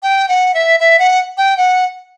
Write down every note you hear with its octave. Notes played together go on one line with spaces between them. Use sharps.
G5
F#5
E5
E5
F#5
G5
F#5